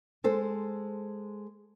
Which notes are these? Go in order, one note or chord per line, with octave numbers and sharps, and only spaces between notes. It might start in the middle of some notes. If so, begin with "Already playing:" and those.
G#3 A4 C5